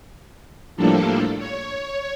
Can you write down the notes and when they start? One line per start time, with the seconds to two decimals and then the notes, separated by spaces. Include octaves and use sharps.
0.76 A2 F3 G3 A#3 D4 A4
1.38 C#5